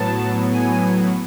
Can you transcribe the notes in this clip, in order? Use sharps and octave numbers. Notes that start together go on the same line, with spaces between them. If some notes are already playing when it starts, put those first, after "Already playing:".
Already playing: A2 F#3 B3 A5
G#5